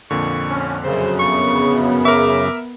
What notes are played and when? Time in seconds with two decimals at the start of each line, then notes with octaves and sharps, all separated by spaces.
0.11 F2 A#2 D3 C#6
0.50 C#4
0.84 F#2 C#3 C5
1.19 B3 C#6
2.05 A#4 E5 D6